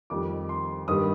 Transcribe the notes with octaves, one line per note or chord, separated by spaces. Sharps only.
F2 D#3 G3 D6
C6
G2 D#3 G3 D#6